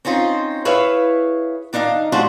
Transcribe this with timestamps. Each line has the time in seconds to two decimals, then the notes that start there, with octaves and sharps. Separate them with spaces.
0.05 C4 C#4 D#4 F4 C5
0.65 E4 G#4 B4 C#5 E5 F5
1.73 D#3 D4 D#4 E5 F5
2.12 G3 G#3 D4 F4 F#4 C5